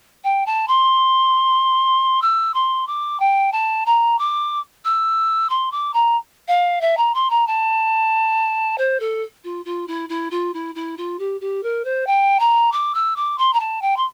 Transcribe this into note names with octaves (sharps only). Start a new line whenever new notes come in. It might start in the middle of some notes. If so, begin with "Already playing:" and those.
G5
A5
C6
E6
C6
D6
G5
A5
A#5
D6
E6
C6
D6
A#5
F5
E5
A#5
C6
A#5
A5
C5
A4
F4
F4
E4
E4
F4
E4
E4
F4
G4
G4
A#4
C5
G5
A#5
D6
E6
D6
C6
A#5
A5
G5
C6